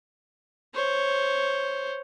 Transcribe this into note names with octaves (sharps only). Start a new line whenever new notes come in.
C5 C#5